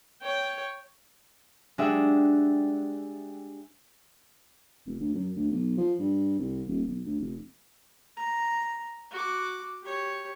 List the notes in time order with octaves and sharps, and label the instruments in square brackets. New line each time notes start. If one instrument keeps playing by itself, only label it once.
[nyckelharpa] C#5 G5
[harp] G#3 D4 G4 E5 F#5
[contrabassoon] F1
D2
F#2
D2
B1
F3
G2
C2
D#1
B1
D2
F1
[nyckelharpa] A#5
F#4 D6
G4 C#5